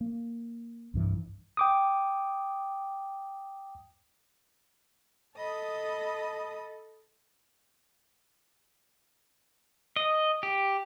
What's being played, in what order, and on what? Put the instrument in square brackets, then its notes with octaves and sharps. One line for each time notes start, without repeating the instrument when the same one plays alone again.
[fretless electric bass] A#3
C2 G2 E3
[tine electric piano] G5 D6 D#6
[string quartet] A4 D#5 A5 B5 D#6
[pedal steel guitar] D#5
G4